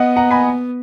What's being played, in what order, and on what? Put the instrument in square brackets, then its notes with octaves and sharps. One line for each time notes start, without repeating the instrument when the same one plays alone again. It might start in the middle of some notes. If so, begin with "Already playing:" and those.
Already playing: [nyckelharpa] B3 [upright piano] D#5 F#5
[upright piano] F#5 A#5
G#5 B5